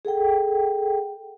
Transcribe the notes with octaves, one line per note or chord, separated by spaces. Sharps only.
G#4 A4 F#5 G5